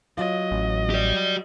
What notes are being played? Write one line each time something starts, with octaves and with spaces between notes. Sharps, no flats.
F#3 F4 D#5
A1
G4 D5